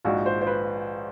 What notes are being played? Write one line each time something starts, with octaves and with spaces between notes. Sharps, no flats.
A#1 G#2 F3 F#4
C5
C5
B4